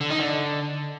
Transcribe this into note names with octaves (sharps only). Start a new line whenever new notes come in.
D3
D#4
D3